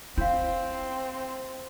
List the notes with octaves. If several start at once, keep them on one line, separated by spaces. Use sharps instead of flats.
C4 E4 F5 G6